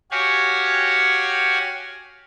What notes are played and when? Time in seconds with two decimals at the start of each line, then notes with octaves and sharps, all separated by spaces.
0.11 F#4 G4 C#5 F5 F#5 G#5